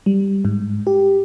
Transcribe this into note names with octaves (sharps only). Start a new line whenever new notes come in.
G3
G#2
G4